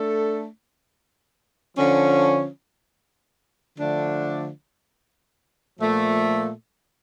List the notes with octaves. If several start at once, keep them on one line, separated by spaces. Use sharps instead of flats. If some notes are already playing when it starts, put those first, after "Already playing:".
Already playing: A3 D4 A4
D3 F3 C#4
D3 F3 A3 D4
A#2 F3 A3